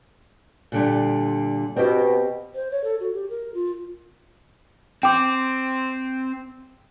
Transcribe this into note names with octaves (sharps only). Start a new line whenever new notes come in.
A#2 D3 G3
B2 C4 G4
C5
C#5
A4
F#4
G4
A#4
F4
C4 C5 G5 D6